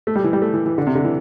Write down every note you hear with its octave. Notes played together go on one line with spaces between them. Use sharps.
A3
G3
E3
G3
A3
E3
E3
D3
C3
D3
E3